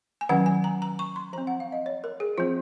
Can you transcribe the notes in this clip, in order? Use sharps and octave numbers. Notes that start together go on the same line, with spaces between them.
G#5
D#3 F#3 C#4 F#5
G#5
A#5
A#5
C#6
C6
F3 C4 A#5
F#5
F5
D#5
C#5
A#4
G#4
F3 C4 F4